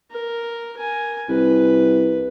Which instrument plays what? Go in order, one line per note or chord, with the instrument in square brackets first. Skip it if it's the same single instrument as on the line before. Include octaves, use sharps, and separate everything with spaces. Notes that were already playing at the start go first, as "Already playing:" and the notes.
[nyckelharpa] A#4
A#4 G#5
[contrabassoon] C2 [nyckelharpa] B4